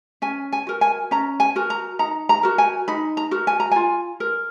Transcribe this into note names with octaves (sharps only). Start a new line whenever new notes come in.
C#4 G#5
G#5
F#4 A#4
G#5
C#4 A#5
G#5
F#4 A#4
A#5
D#4 A#5
A#5
F#4 A#4
G#5
D#4 B5
A#5
F#4 A#4
G#5
A#5
F4 G#5
A#4